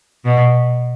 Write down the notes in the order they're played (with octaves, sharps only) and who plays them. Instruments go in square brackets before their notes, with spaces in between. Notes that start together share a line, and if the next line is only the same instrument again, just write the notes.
[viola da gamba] B2